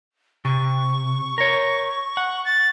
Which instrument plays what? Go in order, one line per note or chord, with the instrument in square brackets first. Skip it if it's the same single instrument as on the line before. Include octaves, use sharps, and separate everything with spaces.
[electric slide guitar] C3 [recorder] C#6
[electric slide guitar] A#4 C#5
F#5
[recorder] A6